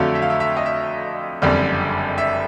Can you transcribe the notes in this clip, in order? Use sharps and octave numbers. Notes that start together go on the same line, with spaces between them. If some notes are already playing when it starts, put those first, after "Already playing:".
Already playing: F2 D3 F#3 A3 F5
E5
F5
E5
E5
D#5
E5
F#1 F2 D3 G3
E5